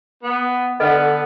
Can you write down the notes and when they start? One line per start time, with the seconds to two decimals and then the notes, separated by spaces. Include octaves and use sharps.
0.23 B3
0.80 D3 B3 A4 B4 D#5